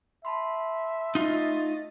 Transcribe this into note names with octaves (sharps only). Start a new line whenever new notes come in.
E5 A5 B5 C6
A3 D#4 F4 D#5 A6